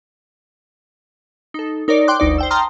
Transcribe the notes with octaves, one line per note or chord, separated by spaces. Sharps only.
D#4 A4
D#4 A#4 C#5 D5
G5 C6 D6 F#6
G1 D2 D#4 D5
C5 G5 E6
G5 A5 A#5 C6 D#6 F6